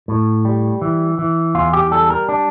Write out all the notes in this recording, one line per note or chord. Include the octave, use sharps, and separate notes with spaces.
A2
G3
E3
E3
E2 F4
G4
G3 A4
A#4
D4